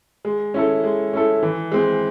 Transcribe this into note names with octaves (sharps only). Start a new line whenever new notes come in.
G#3
C#4 E4 A4
G#3
C#4 E4 A4
E3
G#3 C4